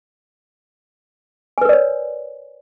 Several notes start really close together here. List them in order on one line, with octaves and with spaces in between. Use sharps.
G#5 B4 A#4 D5 C#5